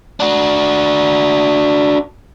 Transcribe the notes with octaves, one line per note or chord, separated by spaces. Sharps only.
D4 F#4